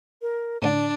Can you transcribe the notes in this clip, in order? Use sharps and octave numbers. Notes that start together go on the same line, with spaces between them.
A#4
A2 D3 D4 D5